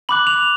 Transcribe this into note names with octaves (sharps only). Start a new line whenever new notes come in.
B5 D6 F#6 F#7
F7